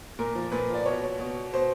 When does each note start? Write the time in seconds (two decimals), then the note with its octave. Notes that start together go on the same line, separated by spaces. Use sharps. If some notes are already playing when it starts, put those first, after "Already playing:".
0.19 A#2 A#4
0.35 F3
0.52 A#2 B4
0.70 F3 D5
0.86 B2 C#5
1.20 B2
1.54 B2 C5